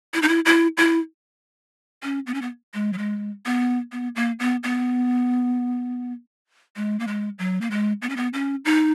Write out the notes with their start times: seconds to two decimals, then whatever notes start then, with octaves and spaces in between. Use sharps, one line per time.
0.14 E4
0.22 D#4
0.28 E4
0.45 E4
0.77 E4
2.03 C#4
2.27 B3
2.34 C#4
2.42 B3
2.74 G#3
2.93 F#3
2.98 G#3
3.45 B3
3.92 B3
4.16 A#3
4.39 B3
4.63 B3
6.76 G#3
7.00 A#3
7.07 G#3
7.39 F#3
7.61 A#3
7.71 G#3
8.02 B3
8.10 C#4
8.16 B3
8.33 C#4
8.65 D#4